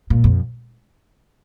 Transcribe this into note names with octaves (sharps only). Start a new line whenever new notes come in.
A#2
F2